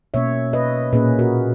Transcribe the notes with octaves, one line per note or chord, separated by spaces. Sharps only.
B2 A#3 C#4 C#5 E5
B4 D#5
A#2 A#3 C#4 G#4 B4
F#4 A#4